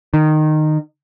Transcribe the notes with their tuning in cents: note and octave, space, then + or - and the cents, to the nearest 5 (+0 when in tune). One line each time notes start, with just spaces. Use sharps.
D#3 -15